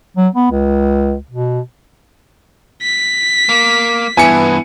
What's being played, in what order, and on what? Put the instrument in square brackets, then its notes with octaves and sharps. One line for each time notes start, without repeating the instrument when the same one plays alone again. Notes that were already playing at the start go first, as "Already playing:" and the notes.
[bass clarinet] F#3
B3
C#2
B2
[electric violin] B6
[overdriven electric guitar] A#3
[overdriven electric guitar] G2 E3 [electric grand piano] B3 E4 C#7 [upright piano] G#5